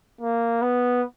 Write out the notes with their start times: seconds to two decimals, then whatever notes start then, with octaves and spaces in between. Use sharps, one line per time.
0.21 A#3
0.62 B3